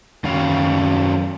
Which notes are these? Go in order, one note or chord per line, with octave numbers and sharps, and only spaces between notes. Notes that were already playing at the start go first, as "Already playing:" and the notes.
F#2 D#3 C#4 F#4 F5